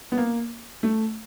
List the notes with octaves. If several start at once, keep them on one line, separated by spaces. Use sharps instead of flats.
B3
A#3
A3